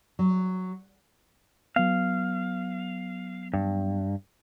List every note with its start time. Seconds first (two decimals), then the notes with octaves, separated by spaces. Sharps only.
0.19 F#3
1.76 F#3 B3 F5
3.54 G2